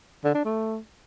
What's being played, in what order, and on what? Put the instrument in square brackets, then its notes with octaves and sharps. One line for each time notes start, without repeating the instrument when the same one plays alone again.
[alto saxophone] D3
D4
A3